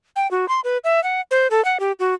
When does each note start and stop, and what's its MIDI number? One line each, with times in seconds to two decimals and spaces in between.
0.16 0.30 79
0.31 0.48 66
0.49 0.60 84
0.64 0.78 71
0.84 1.03 76
1.04 1.21 78
1.31 1.47 72
1.51 1.63 69
1.65 1.78 78
1.80 1.92 67
1.99 2.14 66